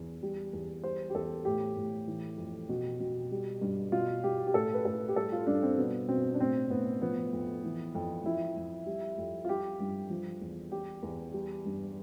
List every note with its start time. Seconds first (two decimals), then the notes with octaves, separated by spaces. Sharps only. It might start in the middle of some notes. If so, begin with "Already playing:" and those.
Already playing: E2
0.23 G3
0.53 E2
0.84 G3 C5
1.10 G4
1.14 E2 A4
1.45 A2 G4
1.77 A2
2.07 E3
2.38 F2
2.69 B2
3.00 B2
3.32 G3
3.61 G2
3.92 B2 F4
4.24 B2 G4
4.47 G4
4.54 A2 A4
4.74 B4
4.85 A2 A4
5.09 G4
5.16 G3 A4
5.32 F4
5.47 G2 D4
5.63 C4
5.77 B2 B3
6.08 B2 C4
6.34 D4
6.40 A2 C4
6.70 A2 B3
7.02 F3 B3
7.33 F2
7.64 E3
7.95 F2
8.25 F3 E4
8.56 F2
8.86 G3
9.18 F2
9.45 F4
9.49 G3 G4
9.80 G2
10.10 F3
10.41 E2
10.72 G3 G4
11.03 E2
11.34 G3
11.65 G2